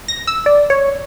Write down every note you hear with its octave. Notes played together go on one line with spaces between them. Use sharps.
A#6
E6
D5
C#5